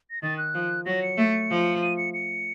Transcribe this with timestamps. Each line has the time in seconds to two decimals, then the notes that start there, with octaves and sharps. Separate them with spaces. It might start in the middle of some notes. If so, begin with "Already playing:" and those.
0.11 A#6
0.22 D#3 A6
0.38 F#6
0.54 F3
0.86 F#3 A#6
1.03 C#7
1.18 A3
1.50 F3
1.82 D#7
1.97 C#7
2.14 C#7